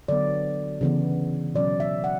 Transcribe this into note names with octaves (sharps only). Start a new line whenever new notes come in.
D3 F#3 B3 D5
C#3 E3 B3
B2 F#3 C#4 D5
E5
F#5